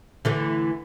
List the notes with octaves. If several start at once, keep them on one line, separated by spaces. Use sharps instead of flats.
D3 E3 A3